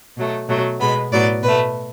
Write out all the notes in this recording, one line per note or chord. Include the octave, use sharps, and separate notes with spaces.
B2 F#3 A3
B2 F#3 A3
B2 G#3 B3 B5
A2 F#3 B3 D5
B2 A3 B4